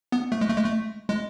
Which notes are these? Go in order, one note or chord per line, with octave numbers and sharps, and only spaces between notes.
B3
A3
G#3
A3
G#3
A3
G#3